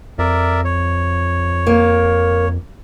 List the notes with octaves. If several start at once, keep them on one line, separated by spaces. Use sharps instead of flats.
F2 A#4 D5 E5
C#5
A#3